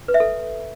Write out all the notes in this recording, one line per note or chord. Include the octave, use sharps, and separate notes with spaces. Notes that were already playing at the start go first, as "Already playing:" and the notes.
B4
E5
A4